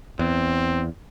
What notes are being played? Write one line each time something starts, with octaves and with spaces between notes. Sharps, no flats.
E2 C4